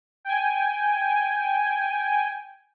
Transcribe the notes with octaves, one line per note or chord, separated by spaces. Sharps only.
G5 G#5